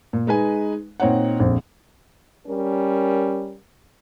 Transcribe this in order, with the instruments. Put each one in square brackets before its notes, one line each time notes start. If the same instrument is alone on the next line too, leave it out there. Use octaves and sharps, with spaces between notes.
[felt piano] A#2
G#3 D#4 B4 G#5
A#2 C4 D#4 C#5 F#5
A#1 F2
[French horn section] G3 C#4 A#4